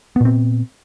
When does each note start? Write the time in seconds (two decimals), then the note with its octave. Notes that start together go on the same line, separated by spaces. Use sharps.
0.16 B3
0.21 A#2
0.25 C4